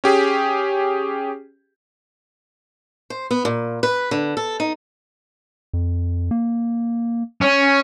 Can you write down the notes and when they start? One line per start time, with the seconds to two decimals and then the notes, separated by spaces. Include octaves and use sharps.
0.04 C#4 G4 G#4
3.10 C5
3.31 B3
3.45 A#2
3.83 B4
4.11 D3
4.37 A4
4.60 D#4
5.73 F2
6.31 A#3
7.41 C#4